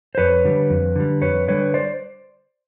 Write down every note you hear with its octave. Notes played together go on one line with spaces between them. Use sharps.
C5
F2 B4 C#5
D3 G3
F2
D3 G3
F2 B4 C#5
D3 G3 B4 C#5
C5 D5